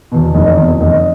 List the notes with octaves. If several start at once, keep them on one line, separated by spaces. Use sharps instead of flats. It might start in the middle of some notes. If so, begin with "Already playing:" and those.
E2 B2
F1 D#5
E2 B2
F1 D#5